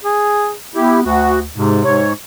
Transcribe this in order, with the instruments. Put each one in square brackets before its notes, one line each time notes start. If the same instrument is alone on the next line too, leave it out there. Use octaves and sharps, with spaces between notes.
[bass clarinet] G#4
[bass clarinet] B3 [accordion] E4 G4
[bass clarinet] D2 [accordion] F#4
[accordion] G#2 [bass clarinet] C3
[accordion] G#2 C#5